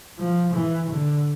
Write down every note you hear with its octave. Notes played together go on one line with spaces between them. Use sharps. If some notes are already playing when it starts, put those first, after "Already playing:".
F3
E3
D3